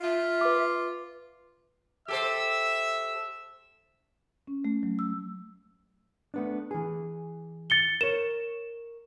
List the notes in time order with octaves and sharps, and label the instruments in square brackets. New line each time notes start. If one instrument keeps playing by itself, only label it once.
[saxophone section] F4 [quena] E5
[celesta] B4 D6
[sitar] G4 A4 C5 [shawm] E5 [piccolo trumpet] E6
[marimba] C#4
A3
F#3
E6
[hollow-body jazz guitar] A3 B3 D4
E3 G#4
[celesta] A6 C#7 G7
[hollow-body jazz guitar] A#4 C#5 [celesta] E7